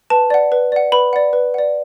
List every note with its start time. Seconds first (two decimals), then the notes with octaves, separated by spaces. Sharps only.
0.10 B4 A5
0.30 D5 F#5
0.52 B4
0.72 D5 F#5
0.92 B4 B5
1.13 D5 F#5
1.33 B4
1.54 D5 F#5